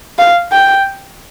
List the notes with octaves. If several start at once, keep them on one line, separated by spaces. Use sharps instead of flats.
F5
G5